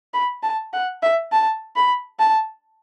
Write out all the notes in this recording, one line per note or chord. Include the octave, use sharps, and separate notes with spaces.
B5
A5
F#5
E5
A5
B5
A5